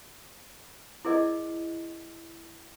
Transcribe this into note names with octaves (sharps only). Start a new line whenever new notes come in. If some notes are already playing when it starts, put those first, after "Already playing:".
E4 G#4 A#4 D5 D#5